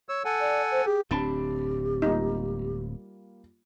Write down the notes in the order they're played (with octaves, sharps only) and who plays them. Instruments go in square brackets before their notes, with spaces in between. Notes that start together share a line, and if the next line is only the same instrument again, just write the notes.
[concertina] C#5 E6
A4 F#5 G#5
[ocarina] D5
C5
[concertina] G4 [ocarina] G#4
[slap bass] D1 C4 D4 [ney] G4 [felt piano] A5 B5 A6
[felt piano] G3 A#3 F4 [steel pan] D#4